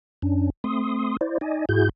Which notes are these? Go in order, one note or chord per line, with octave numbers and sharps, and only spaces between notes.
F#2 C#4 D4
A3 C4 C6 D#6
E4 C5 D5
D#4 D5 D#5 G#5
G#2 E4 F#4 G#4 G6